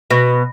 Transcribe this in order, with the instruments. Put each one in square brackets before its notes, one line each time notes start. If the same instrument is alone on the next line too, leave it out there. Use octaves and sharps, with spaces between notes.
[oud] B2